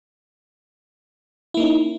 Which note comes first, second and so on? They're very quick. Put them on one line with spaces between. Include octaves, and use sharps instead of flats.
E4 A#3 D#4 C#4